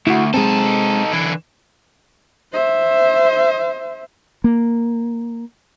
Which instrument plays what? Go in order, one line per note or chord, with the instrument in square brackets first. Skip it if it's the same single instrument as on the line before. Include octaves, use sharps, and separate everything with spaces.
[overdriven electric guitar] D2 [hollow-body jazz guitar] E4 F#4
[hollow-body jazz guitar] G#3 C4 [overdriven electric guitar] D#4 A4
[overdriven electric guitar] D3 E3
[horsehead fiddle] C5 E5
[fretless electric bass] A#3